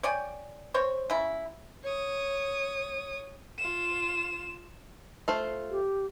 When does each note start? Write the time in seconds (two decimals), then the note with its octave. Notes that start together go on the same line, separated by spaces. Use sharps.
0.03 C#5 D5 G5 G#5
0.74 C4 C5 C#5
1.10 C#3 E4
1.84 C#5 D#6
3.58 F4 E7
5.28 A3 F4 C5
5.71 G4